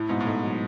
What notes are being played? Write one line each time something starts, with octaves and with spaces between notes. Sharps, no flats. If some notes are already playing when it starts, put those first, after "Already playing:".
Already playing: A2 E4
G#2 B2
A2
G#2 A3
F#3